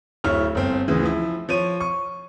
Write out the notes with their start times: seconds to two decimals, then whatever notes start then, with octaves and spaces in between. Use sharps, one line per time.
0.24 D1 E4 C#5 F6
0.55 G1 C4
0.88 D2 C#3 E3
1.03 F3 E4
1.49 F3 C#5 D#7
1.80 C#6